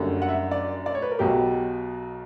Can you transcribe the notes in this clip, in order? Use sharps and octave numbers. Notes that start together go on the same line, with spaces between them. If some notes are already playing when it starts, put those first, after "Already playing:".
Already playing: F#1 F#2 D3 G3
F#5
E5
D5
D5
C#5
B4
A#4
B1 B2 F#3 G4